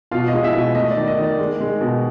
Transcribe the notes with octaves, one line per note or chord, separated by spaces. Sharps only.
B2 F4 F5
D#5
G#3
E4 E5
B2
D#5
A3 D#5
D5
D#3
D#5
D#3
D5
G#3
G#3
B2